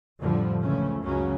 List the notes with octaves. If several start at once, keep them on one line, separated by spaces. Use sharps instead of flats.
F2 A2 D3 F3 G3
C#2 C#3 E3 F3 A3 C#4
C#2 F#2 C#3 F#3 C#4